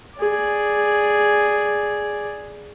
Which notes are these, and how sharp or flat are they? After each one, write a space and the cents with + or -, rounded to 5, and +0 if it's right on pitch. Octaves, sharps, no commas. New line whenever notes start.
G#4 +0 D5 +0